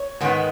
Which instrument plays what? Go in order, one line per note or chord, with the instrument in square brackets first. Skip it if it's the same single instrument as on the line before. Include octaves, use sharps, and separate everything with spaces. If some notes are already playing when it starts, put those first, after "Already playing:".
Already playing: [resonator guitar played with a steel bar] C#5
G#2 D#3 G#3 B3